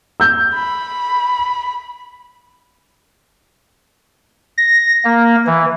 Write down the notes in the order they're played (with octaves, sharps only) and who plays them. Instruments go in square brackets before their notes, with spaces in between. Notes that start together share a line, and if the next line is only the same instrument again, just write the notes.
[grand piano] E6 G6
[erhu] B5
[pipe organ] A#6
A#3
E3